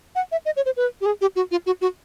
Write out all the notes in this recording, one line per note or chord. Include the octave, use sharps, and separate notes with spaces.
F#5
E5
D#5
C#5
C5
B4
G4
G#4
G4
F#4
F4
F#4
F#4